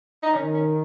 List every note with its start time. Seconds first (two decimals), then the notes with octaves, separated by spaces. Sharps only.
0.23 D#4
0.34 D#3 C#4
0.54 C#4